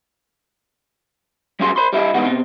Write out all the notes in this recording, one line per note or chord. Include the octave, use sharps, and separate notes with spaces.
F#3 G3 C#4 F#4 G#4 C6
C5 B5 C6
G3 E4 G4 D#5
E2 G#2 G3 B3 D#4 F#5
B2 C4